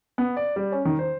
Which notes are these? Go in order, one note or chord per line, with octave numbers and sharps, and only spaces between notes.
B3
D5
G3
C#4
D#3
C5